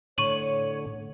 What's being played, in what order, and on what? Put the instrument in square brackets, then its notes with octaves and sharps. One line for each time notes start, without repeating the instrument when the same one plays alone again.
[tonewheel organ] A2 D3 [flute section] C#5 [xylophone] C#6 D#7 F#7